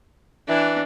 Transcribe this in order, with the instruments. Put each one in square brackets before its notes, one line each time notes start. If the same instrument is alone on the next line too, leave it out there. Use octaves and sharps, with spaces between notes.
[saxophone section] E3 [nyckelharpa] D4